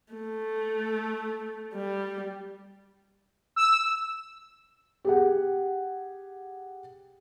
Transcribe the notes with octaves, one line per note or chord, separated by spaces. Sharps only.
A3
G3
E6
G4 G#4 F#5